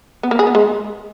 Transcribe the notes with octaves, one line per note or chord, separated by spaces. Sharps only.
B3
A#3
G#4
B3
G#3